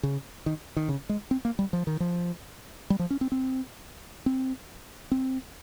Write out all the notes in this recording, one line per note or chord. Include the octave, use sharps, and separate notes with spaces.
C#3
D#3
D#3
C#3
G#3
C4
A#3
G3
F3
D#3
F3
G3
F3
C#4
C4
C4
C4
C4